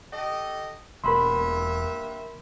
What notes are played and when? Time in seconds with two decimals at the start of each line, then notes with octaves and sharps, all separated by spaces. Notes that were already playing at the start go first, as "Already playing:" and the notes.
0.11 G4 A4 D#5
1.04 E1 G2 A#3 A#4 E5 B5 C6